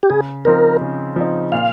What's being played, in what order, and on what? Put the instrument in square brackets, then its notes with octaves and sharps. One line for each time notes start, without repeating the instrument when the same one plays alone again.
[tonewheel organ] G4
[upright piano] C#3 [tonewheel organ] G#4
[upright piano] F3 C4 D#4 [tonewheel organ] A#4
[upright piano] C#3
F3 C4 D#4
[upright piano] A#2 [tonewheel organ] F5